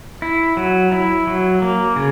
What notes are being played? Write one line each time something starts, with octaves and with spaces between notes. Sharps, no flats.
E4
F#3
E4
F#3
A#3
C#3